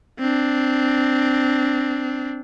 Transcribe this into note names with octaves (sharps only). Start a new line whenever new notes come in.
C4 D4